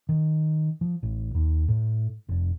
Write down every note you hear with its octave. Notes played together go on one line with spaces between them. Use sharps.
D#3
F3
A1
D#2
A2
F1